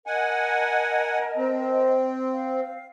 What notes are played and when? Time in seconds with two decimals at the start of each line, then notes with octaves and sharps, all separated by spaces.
0.07 A#4 D#5 F#5 G#5 A5
1.37 C4
2.33 F5